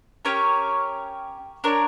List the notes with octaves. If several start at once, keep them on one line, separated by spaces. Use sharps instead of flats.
C#4 G4 A#4 C#5
D4 A#4 C#5